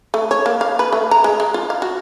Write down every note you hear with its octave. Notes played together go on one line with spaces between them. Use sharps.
A3
C#5
A#3
F5
B4
A3
A#5
G#3
G#3
F4
F5
F#4